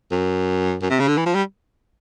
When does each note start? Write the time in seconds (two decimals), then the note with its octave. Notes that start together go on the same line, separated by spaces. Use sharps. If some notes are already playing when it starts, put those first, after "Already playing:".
0.12 F#2
0.82 F#2
0.90 C3
1.00 C#3
1.08 D3
1.17 E3
1.26 F3
1.35 G3